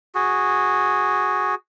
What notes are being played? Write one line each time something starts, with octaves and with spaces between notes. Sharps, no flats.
F#4 G#4